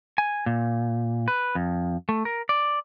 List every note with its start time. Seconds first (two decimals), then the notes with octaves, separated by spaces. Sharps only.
0.18 G#5
0.46 A#2
1.28 B4
1.55 F2
2.09 A3
2.25 A#4
2.49 D5